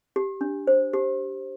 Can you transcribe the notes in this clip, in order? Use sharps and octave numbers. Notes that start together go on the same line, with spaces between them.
G4
D4
C5
G4